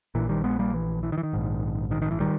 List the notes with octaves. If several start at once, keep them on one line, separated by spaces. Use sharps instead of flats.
A#1 A#2 E3
D#3 G3
G#3 B3
G3 A#3
E3
E3
D#3
E3
D#3
A#1 G#2
D#3
D#3
E3
D#3 G3